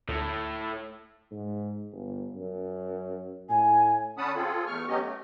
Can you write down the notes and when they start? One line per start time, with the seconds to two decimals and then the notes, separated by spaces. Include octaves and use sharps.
0.09 D2 A2
1.32 G#2
1.92 G1
2.34 F#2
3.49 A2 G#5
4.18 D3 C#4 F#5 A5 B5 D#6
4.36 C4 F4 G#4 A4
4.67 E2 A3 C#6 F6
4.88 F#3 B3 C#4 G4 D#5
5.01 A3